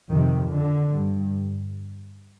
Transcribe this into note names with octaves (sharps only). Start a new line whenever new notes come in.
F2 C3 D#3
D3
G2